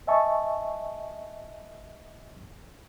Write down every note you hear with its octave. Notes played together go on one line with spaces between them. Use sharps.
D#5 E5 G#5 A5 C#6